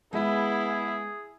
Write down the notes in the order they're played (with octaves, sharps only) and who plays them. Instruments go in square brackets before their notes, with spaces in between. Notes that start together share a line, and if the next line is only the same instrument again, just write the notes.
[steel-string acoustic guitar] G#3 D#5 [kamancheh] B3 [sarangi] E4 [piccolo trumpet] G#4